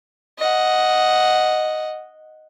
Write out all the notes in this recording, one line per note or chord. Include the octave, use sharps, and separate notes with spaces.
D#5 F#5